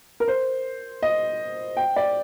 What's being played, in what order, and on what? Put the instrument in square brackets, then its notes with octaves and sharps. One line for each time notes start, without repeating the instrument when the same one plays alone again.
[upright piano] A#4
C5
D#5
G5
D5